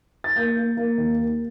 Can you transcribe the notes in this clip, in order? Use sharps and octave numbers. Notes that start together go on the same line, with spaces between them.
A6
A#3 G6
A#3
A#3
D#2
A#3